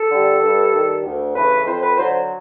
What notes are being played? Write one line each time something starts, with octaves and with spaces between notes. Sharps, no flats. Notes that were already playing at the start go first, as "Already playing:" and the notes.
Already playing: A4
D3 G3
G2
D#3 G3
D2
C#3 E3 A3 B4
F2 C5
B4
D3 F#3 C5